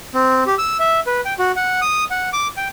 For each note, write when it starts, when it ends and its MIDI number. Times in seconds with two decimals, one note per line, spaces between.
0.14 0.44 60
0.47 0.55 67
0.58 0.77 88
0.80 1.00 76
1.07 1.21 71
1.25 1.34 79
1.39 1.52 66
1.56 1.80 78
1.82 2.04 87
2.11 2.29 78
2.33 2.48 86
2.57 2.68 79